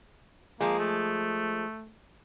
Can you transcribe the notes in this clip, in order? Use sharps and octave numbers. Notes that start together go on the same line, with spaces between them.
F3 G#3 A#3
A3